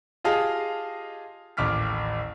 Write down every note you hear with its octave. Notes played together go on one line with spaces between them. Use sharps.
F4 G4 G#4 D#5 F5 A5
A1 D#2 D6 F6 B6